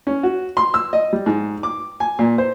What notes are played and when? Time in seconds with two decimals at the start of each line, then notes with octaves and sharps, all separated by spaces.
0.07 C#4
0.23 F#4
0.57 C6
0.74 E6
0.93 D#5
1.13 G3
1.26 G#2
1.63 D6
2.00 G#5
2.19 A#2
2.38 C5